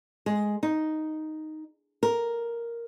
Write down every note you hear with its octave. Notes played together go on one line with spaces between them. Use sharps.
G#3
D#4
A#4